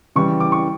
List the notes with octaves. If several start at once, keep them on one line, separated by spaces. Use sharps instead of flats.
C#3 E3 G3 C#6
D6
C#6